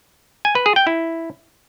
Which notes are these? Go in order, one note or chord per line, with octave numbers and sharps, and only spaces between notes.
G#5
B4
G#4
G5
E4